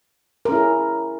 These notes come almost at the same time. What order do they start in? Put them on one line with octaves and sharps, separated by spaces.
A#4 C#4 E4 G#4